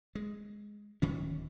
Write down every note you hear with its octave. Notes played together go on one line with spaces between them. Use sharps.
G#3
D1 D#3 C#4